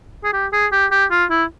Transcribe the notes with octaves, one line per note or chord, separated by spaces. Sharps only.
G#4
G4
G#4
G4
G4
F4
E4